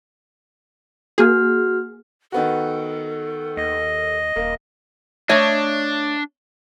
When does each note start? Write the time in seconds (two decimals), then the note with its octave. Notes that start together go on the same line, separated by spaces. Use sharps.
1.18 A#3 F#4 G#4 F6
2.32 D#3 B3 F#4 A4
3.57 D#2 D#5
4.36 D#1 A#3
5.29 A3 D4 C#5 D#5